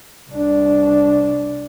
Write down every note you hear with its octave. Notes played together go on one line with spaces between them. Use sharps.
C2 D4